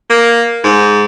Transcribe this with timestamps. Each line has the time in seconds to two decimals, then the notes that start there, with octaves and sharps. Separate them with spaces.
0.10 A#3
0.64 G#2